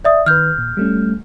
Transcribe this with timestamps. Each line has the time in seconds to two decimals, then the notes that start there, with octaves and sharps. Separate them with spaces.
0.05 D5 E5 D#6
0.26 D#3 B4 F6 G6
0.58 A#2
0.77 G3 A3 C#4